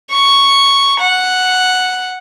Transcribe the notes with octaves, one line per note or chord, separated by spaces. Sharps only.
C#6
F#5